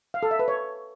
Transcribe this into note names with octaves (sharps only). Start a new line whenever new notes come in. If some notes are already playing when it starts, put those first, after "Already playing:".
F5
A4
E5
B4
C#5